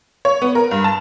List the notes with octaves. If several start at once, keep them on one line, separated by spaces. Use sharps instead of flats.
C#5
B3
A#4
G2
A5